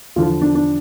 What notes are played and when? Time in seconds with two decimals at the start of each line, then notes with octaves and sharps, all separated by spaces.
0.16 E2 D3 F3 F4
0.42 D4
0.55 D4